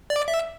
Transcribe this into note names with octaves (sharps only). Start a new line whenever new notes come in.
D5
E5